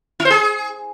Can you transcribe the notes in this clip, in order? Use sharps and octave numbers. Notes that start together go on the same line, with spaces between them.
E4
C5
G#4